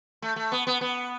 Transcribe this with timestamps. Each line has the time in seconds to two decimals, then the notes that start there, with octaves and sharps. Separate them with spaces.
0.22 A3
0.36 A3
0.52 B3
0.67 B3
0.81 B3